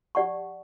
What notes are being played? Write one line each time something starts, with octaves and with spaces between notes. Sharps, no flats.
G4 D5 F#5 A5 C#6